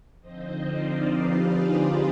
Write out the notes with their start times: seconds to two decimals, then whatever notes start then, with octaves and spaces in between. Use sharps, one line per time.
0.21 D3 F3 C4 D#4 C5 D#5
0.63 D5 F5
1.06 G4 B4
1.34 F4 G#4
1.62 G4 B4